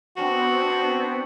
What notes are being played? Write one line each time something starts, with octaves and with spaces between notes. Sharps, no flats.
B3 C4 D4 F#4